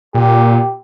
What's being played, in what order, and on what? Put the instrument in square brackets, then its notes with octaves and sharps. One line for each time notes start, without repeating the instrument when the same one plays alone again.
[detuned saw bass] A#2 [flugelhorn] G4